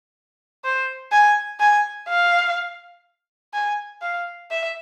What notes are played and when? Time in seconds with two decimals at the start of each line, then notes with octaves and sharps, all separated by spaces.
0.64 C5
1.12 G#5
1.60 G#5
2.09 F5
3.54 G#5
4.02 F5
4.51 E5